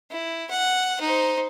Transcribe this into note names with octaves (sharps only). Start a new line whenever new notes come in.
E4
F#5
D#4 C5